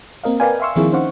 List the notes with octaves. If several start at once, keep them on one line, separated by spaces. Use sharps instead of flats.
A#3 C4 A#4 D#5 F5
A#4 B4 D5 F5 G5 G#5
E5 F5 C6 C#6 E6
D#3 F3 A#3 C4 E4 G#4
C#4 D#4 C5 F5 F#5 C#6